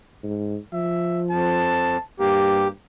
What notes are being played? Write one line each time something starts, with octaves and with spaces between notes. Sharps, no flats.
G#2
F3 E5
F2 A5
G2 A#3 G4